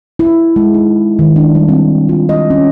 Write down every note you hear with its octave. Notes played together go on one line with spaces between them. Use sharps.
E4
G#3
D#4
D#3
D4
G3
C4
F4
D#5
C#4